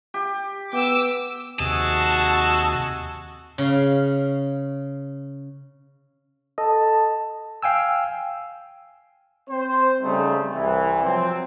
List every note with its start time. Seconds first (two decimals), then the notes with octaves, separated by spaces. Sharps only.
0.14 G4
0.73 B3 G5 D6 E6
1.60 D#2 C3 F#4 G#4 D#5 A5 E6
3.58 C#3 F5
6.58 A4 D#5 A5
7.63 F5 G5 G#5 E6
9.49 C4 C5
10.02 C#3 G3 A3 C4 D#4
10.53 C2 E3
11.04 F3 F#3 C4